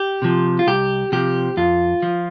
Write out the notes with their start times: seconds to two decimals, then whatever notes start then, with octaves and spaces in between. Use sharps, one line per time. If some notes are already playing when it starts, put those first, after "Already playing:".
Already playing: G4
0.22 C3 F3
0.59 F4
0.67 C2 G4
1.12 C3 F3 G4
1.57 F2 F4
2.03 F3